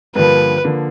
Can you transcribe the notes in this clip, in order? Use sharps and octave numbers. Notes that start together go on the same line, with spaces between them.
G2 D3 F3 A#3 B4
D3 F3 A#3